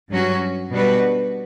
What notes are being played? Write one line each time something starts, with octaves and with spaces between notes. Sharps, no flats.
G2 F#3 C#4 F#4
B2 G3 D4 F#4 B4